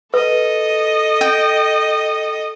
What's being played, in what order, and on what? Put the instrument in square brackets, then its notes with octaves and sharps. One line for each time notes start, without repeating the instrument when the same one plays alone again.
[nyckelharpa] A4 [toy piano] B4 [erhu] D#5
[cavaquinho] G5